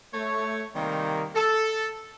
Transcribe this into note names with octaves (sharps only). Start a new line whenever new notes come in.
A3 C#5
C3 D#3 G3 A#3
A4